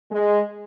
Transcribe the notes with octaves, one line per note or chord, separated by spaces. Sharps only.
G#3